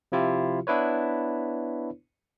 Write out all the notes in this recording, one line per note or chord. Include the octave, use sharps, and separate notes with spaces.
C3 F3 E4 F4 G4
B3 D4 E4 B4 C#5